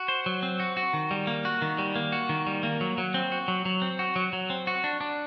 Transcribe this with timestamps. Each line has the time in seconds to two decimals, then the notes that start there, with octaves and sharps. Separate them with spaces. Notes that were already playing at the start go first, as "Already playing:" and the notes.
Already playing: F#4
0.08 C5
0.26 F#3
0.43 C4
0.60 F#4
0.77 F#4
0.93 D#3
1.11 G3
1.27 A#3
1.45 F#4
1.62 D#3
1.78 G3
1.96 A#3
2.12 F#4
2.29 D#3
2.47 G3
2.63 A#3
2.81 F#3
2.98 F#3
3.14 C4
3.32 F#4
3.48 F#3
3.65 F#3
3.82 C4
3.99 F#4
4.16 F#3
4.33 F#3
4.50 C4
4.67 F#4
4.84 D4
5.01 D4